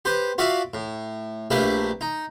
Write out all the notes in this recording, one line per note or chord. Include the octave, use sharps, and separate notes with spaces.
G4 B4 C5
F4 F#4 D5 E5 F5
A2
A#1 A3 A#3 D4 G4 B4
D#4